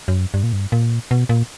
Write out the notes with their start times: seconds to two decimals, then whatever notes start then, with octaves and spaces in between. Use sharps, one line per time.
0.08 F#2
0.34 G2
0.43 A#2
0.53 G2
0.72 A#2
1.11 B2
1.29 A#2